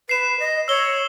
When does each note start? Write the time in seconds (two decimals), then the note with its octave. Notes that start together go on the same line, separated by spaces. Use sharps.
0.09 B4 C7 E7
0.40 D#5
0.68 C#5 E6 G7